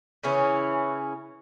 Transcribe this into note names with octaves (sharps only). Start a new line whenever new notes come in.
C#3 E3 C#4 E4